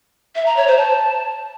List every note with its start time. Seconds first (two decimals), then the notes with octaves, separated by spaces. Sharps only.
0.35 E5
0.46 A#5
0.57 C#5
0.67 C5
0.78 A5